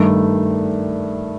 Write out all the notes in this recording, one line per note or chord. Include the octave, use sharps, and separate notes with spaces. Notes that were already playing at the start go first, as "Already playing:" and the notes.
Already playing: G2 D#3 A3